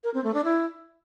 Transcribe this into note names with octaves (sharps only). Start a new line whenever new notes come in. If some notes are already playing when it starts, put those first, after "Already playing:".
A#4
C4
A3
D4
E4